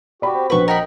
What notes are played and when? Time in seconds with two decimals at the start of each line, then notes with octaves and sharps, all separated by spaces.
0.22 F#4 G4 D5 B5
0.34 C4
0.50 A#1 B3 F#4 B4 C#6
0.68 A#4 D#5 F#5 G5 B5